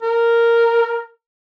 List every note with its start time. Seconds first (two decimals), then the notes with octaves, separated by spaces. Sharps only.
0.02 A#4